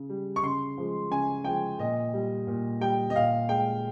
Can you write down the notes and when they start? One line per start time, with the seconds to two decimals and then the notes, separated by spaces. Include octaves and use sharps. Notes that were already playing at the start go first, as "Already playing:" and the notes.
Already playing: C#3
0.10 G3
0.36 C#6
0.43 C#3 C6
0.78 F3 G#3
1.11 C#3 G#5
1.44 F3 G#3 G5
1.79 A#2 D#5
2.14 G3
2.47 A#2
2.81 G3 G5
3.10 D#5
3.15 A#2 F5
3.49 G#3 G5